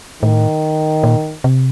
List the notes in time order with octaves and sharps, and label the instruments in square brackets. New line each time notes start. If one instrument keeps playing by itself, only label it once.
[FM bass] A2 [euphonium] D#3
[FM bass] A#2
C3